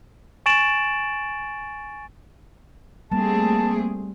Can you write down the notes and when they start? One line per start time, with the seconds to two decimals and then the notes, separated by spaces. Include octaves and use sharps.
0.46 G#5 C#6 A6 D7 E7 F#7
3.12 G3 A3 A#3 C4 G#4 A5